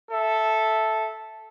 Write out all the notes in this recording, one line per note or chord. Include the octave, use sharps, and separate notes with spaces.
A4 E5